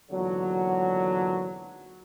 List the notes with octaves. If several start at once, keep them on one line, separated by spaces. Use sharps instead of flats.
G#1 E2 A#2 D3 F#3